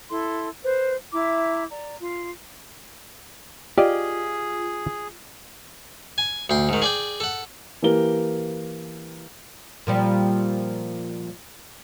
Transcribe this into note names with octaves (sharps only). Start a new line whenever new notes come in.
E4 A4 C6
B4 C5
E4 E5 A#5 D6
D5 A#5
F4
F4 G4 G#4 D5 D#5
G#5
D2 G5 C6
G#2 D#3
G#4 D5 G5
A4 F#5
E3 A#3 G4 A#4 G7
A#2 F3 G3